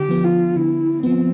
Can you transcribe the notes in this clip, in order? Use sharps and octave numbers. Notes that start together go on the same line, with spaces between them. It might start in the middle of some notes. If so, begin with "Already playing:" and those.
Already playing: D3 G4
F3 B3
F4
D3 E4
F3 B3 C4